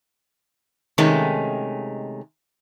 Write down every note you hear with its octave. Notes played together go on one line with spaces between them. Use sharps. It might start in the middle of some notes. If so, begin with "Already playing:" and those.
C3 D#3 G#3 A3 C#4